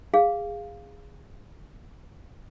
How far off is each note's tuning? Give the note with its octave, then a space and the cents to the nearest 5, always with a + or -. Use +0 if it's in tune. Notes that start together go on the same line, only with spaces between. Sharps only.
G#4 -15 F5 +0